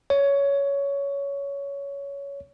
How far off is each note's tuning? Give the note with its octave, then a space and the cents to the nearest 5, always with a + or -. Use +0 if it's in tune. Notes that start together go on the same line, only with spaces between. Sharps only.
C#5 +15